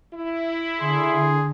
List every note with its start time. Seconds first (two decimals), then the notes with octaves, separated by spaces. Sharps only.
0.14 E4
0.80 D3 G#4 C6